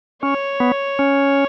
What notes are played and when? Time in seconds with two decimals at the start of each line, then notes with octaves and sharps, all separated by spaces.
0.22 C#4 C#5
0.60 B3
0.99 C#4